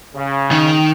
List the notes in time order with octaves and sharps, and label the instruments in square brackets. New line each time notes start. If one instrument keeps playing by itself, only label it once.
[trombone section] C#3
[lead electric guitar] D#3